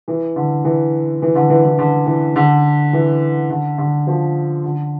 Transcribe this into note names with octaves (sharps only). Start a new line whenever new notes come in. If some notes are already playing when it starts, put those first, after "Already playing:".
E3
D3
E3
E3
D3
E3
E3
D3
E3
D3
E3
D3
D3
F3
D3